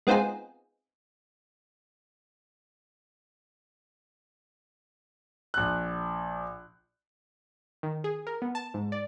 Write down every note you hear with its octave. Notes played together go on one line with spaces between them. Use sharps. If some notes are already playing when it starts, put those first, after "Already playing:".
G#3 B3 C4 D#4 F4 G#4
A#1 F#6
D#3
G#4
A#4
B3
A5
G#2
D5